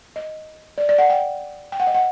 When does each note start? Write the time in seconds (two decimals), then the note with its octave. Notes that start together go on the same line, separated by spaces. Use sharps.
0.16 D#5
0.78 D5
0.89 D5
0.99 F#5
1.10 G5
1.72 G5
1.80 F#5
1.87 D#5
1.94 F#5